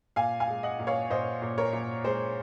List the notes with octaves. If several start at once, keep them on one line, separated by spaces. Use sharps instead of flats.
A#2 F5 G#5
F5 G#5
G#3
D#5 F#5
A#2
C#5 F5
A#2 C5 D#5
A#2
A#4 C#5
A#2
G#3 C5